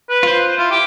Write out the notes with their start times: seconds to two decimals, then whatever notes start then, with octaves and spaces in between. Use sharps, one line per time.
0.09 B4
0.23 F4 C5
0.58 E4 F4
0.71 G4